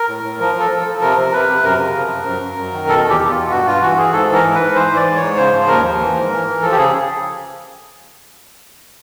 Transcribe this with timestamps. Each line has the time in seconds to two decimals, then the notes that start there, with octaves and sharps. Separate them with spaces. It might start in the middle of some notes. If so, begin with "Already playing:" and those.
Already playing: A#4
0.08 A2
0.24 A2
0.40 F3 A#4
0.55 F3 A4
0.71 F3
0.81 F3 A4
1.01 C3 A#4
1.18 C3
1.32 C3 B4
1.49 C3
1.64 F#2 A#4
1.79 C#3
1.96 F3
2.10 F#2
2.26 F#2
2.42 F#2
2.58 F#2
2.73 D#3
2.88 B2 A4
3.04 E2
3.10 G4
3.20 E2
3.30 B2 F4
3.50 G2 F#4
3.66 G2 F4
3.82 E3 F#4
3.97 E3 G#4
4.12 G#2 A4
4.29 E3
4.34 A#4
4.44 G#2
4.55 G#2 B4
4.75 E3 C5
4.91 E3
4.96 D5
5.06 G#2
5.16 G#2 C#5
5.37 C#3 C5
5.52 F3
5.68 D#2 A#4
5.85 F3
6.00 E3
6.15 G#2
6.31 E3
6.47 E3
6.62 F3 A4
6.72 G4
6.77 C#3 G#4